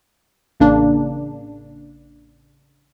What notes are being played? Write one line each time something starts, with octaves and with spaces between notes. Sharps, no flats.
A1 C#3 A#3 D4